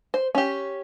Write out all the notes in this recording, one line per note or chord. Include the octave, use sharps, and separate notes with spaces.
C5
C#4 G4